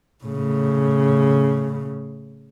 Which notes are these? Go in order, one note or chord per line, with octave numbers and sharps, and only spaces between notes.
A2 C#3